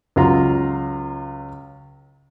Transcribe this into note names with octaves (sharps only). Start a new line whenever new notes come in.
C#2 F#3 F4 A#5